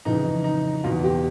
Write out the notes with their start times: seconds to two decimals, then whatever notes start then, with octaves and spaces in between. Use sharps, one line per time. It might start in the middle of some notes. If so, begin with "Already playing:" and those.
0.05 F2 C#3 E3 D#4
0.44 D#4
0.84 E2 B2 F4
1.04 G4